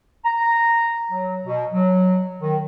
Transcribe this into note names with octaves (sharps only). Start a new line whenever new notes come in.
A#5
F#3
B2
F#3
D#3